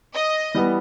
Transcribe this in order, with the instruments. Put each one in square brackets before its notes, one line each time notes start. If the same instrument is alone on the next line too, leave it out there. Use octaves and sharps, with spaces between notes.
[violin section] D#5
[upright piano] E3 G3 B3